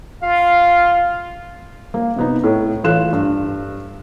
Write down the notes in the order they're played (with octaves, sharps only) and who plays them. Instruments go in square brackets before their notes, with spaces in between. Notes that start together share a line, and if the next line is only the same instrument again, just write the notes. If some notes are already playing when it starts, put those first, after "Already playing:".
[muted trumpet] F4 [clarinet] F5
[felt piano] A#3
C3 B3 D#4
A2
A1 F4 A4 F#6 E7
G2